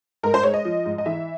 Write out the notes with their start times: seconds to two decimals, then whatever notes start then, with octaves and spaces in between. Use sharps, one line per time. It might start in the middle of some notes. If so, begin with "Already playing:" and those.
0.23 G#2 A#4
0.34 C5
0.43 G#3 C#5
0.54 D#5
0.65 F3
0.85 G#2
0.98 D#5
1.06 E3 E5